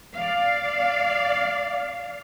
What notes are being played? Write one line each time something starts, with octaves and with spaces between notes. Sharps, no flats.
D5 F5